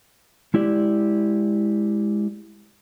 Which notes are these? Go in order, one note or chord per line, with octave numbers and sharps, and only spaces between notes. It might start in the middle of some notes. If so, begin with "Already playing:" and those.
G#3 E4 G4 D5